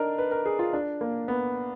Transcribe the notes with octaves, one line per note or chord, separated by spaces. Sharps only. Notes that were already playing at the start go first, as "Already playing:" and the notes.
Already playing: D4 D#4 A#4
B4
A#4
G#4
F4
D4
A#3
B3